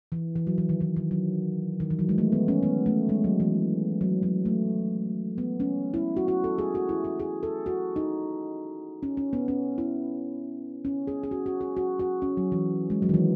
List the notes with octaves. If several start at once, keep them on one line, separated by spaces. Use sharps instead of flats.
E3
E3
F#3
E3
D#3
E3
D#3
F#3
D#3
E3
F#3
G#3
A3
B3
C#4
B3
A3
G#3
F#3
E3
F#3
F#3
A3
B3
C#4
E4
F#4
F#4
A4
G#4
F#4
E4
F#4
G#4
A4
F#4
D#4
C#4
C#4
B3
C#4
E4
C#4
G#4
G#4
F#4
F#4
G#4
F#4
F#4
C#4
F#3
E3
G#3
F#3
D#3
E3